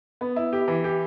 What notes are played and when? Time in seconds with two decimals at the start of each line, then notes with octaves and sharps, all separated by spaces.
0.21 B3
0.36 E4
0.53 G4
0.68 E3
0.84 G4